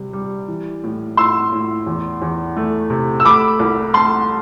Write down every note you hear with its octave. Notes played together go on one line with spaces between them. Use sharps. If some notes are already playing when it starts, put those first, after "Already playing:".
Already playing: C3 G3
G3
E3
A2
A2 C6 E6
A2
E2
E2
A3
C3
E6
A3 B5 D6
C2
A3 A5 C6